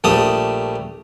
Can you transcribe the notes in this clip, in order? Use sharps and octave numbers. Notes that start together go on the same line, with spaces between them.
A#1 G3 A3 A5 D#6